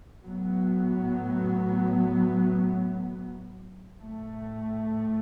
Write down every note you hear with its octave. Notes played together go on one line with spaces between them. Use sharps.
A2 F#3 B3
A2 A3